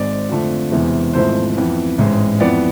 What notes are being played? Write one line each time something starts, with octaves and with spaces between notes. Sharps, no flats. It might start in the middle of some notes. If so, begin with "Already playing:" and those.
Already playing: G#1 G#2 G#3 D5
F2 D3 F3 A3 D4
E1 E2 C3 E3 G#3
G#1 G#2 F3 A3 E4 C5
F2 E3 B3
A1 G#2 G#3
F2 E3 B3 D5